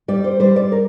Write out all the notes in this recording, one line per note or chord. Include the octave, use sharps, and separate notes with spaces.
G3 D5
C5
G3 C5
D5
A#4